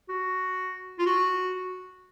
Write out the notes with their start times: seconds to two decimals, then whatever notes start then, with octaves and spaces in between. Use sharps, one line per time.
0.09 F#4
0.99 F4
1.06 F#4